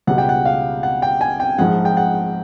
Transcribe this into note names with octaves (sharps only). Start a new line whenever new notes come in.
C#2 B2 G3 F#5
G5
F#5
F5
F#5
G5
G#5
G5
A#1 G#2 F3 G#3 F#5
G5
F#5